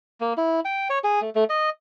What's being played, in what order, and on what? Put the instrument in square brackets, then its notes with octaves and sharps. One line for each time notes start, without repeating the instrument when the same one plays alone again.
[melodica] A#3
E4
G5
C#5
G#4
A3
A3
D#5